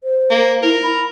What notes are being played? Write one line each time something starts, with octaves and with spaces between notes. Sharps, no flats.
C5
A#3
E4 A#4
B5